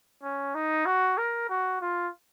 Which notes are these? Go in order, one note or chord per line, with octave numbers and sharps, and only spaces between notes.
C#4
D#4
F#4
A#4
F#4
F4